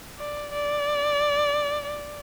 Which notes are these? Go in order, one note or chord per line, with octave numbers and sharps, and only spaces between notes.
D5
D5
D5